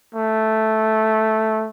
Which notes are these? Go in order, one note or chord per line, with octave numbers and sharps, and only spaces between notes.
A3